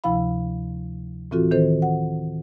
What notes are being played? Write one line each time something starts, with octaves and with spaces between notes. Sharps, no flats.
D2 C3 F3 E4 F5 B5
A2 E3 C4 F4 F#4 A4
D#3 C4 A4 C5
F#5